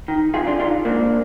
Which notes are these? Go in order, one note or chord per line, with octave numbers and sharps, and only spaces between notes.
D#3
F2 F4 G#4
D4 F4
D#3 D4 F4
G#2 A#3 D4